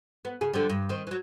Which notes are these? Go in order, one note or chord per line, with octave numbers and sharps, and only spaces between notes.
B3
C#3 G#4
D3 F3 G3
G2
D#3 C4
E3 F#3